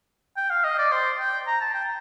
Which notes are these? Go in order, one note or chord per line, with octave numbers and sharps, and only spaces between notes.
G5
F5
D#5
D5
C5
G5
A#5
A5
G5